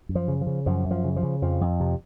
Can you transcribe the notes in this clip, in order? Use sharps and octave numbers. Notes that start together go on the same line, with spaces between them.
F#2
F3
C#3
F3
C#3
F#2 F3
F#2
F3
C#3
F3
C#3
F2 F3
F2
C3